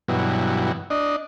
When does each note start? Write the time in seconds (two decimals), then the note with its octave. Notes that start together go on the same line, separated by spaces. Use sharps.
0.08 G2 B2 E3 F#3
0.90 D4 D#5